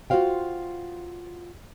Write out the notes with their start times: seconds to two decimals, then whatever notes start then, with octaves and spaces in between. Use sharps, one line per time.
0.10 F4 F#4 A#4 C5 F5 G5